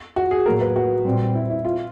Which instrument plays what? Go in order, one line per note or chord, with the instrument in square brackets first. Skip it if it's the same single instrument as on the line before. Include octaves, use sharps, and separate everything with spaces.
[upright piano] F#4
G#4
[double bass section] A2 F#3 A#3 [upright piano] A#4
[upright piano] B4
F#4
[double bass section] A#2 G3 C4
[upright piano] E4
E4
F4